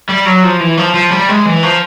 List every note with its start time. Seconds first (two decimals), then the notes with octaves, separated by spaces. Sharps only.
0.09 G3
0.26 F#3
0.43 F3
0.60 E3
0.77 F3
0.94 F3
1.12 G3
1.29 G#3
1.45 E3
1.63 F3